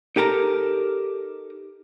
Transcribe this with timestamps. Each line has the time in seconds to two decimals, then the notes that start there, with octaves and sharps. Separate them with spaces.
0.16 D#4 G4 A4 A#4 A#5